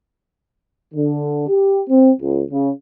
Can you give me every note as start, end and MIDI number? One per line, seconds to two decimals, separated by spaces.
0.94 1.47 50
1.48 1.81 67
1.88 2.11 60
2.21 2.42 37
2.51 2.70 49